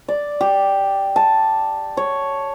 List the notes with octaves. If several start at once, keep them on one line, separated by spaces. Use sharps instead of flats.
D5
G4
A5
C#5